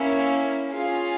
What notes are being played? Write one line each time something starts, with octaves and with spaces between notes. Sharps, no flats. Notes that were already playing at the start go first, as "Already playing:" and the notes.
Already playing: A#3 C#4 E4
C#4 F4 G#4 F5